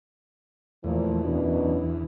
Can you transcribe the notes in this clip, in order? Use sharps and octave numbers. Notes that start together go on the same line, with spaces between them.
E2 A#2 F3 A3
F#2 B2 D4